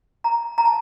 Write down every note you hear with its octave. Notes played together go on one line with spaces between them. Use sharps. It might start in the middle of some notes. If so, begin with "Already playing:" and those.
A#5
A#5
A5